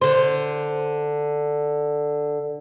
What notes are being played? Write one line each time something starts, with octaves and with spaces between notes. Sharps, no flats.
D3 C5